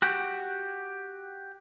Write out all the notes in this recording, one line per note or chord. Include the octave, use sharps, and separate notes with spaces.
F#4 G4